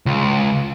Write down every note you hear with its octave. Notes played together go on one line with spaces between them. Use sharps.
C#2